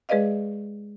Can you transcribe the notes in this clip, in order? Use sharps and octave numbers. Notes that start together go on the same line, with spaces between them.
G#3 G#4 B4 D5 D#5 F5